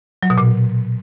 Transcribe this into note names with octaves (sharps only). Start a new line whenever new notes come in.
F#3
B2
A#2